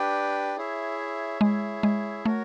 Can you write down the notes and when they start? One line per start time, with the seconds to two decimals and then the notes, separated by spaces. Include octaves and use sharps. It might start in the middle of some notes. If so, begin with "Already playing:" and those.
Already playing: D4 G4 B4 D5 G5
0.57 E4 G#4 C#5 E5
1.41 G#3 E4 G#4 C#5 E5
1.83 G#3
2.26 A3 F#4 A#4 C#5